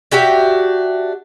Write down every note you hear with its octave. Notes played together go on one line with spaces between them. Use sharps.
D4 F#4 G4 E5